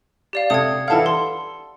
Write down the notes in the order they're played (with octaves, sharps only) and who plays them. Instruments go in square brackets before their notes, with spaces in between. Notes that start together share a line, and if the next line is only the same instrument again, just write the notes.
[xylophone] G4 D5 F5
[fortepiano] C3 A4 [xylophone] D#6 G#6
[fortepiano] E3 A4 F5 [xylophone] F#5 A5
[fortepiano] A4 [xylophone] C6